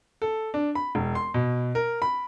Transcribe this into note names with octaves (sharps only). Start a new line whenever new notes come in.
A4
D4
B5
E1
C6
B2
A#4
B5